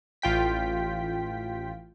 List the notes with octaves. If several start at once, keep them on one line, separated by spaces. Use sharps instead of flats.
A1 F4 G5 B6